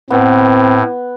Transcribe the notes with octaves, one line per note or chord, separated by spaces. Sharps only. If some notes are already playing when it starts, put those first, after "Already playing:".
A2 B3 C4